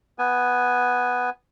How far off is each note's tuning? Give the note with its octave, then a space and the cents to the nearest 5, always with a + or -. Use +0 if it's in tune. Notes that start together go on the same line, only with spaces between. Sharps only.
B3 +0 G#5 -5